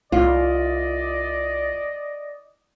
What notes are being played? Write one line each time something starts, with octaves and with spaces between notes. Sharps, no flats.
C2 F4 D5 D#5